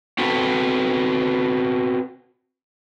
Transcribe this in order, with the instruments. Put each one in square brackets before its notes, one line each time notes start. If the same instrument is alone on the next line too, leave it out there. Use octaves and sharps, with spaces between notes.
[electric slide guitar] C4 F#4 A4 B4